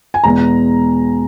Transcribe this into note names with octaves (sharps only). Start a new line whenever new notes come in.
G#5
E2 B2 G#3 B3 A#5